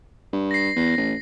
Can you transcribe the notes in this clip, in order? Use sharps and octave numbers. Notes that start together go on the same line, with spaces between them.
G2
A#6 C7
E2
A1